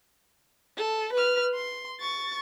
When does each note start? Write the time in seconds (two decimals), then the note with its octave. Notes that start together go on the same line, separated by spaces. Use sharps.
0.77 A4
1.13 B4 F6
1.55 C6
2.01 C#6 A6